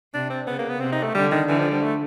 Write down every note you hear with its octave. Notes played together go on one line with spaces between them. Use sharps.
C3 D4
C4
C#3 B3
A#3
B3
C3 C4
D#4
A3
D3 G3
D#3
D3 E3
F3
G3
A3